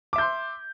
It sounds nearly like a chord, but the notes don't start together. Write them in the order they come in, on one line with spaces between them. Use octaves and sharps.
D6 E5 G6 C6